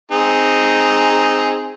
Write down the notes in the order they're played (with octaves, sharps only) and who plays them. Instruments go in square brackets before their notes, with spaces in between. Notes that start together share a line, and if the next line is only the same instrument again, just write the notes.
[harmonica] C4 D#4 G#4